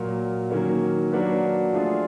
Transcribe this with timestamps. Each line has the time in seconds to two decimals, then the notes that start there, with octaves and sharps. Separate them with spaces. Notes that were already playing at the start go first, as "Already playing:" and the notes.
Already playing: A#2 F#3 A#3
0.50 D#3 F#3 A#3 C#4
1.12 F#3 A#3 D4 F#4 B4
1.73 F3 A3 D4 F4 G#4